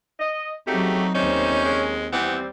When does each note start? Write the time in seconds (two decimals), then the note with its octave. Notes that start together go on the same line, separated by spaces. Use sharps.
0.20 D#5
0.67 C#3 F#3 A3 C4 D#4 F#4 G4
1.15 D#2 G3 A3 C4 C#4 D#4 C5
1.65 G#3
2.13 E3 G3 B3 C4